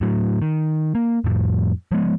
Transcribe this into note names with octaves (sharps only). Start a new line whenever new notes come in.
A2 F#3
D#3
A#3
F2 A2 F3
F3 G#3 B3